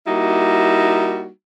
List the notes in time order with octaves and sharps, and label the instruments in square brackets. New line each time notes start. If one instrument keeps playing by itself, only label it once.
[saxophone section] G3 A#3 D#4 E4 F#4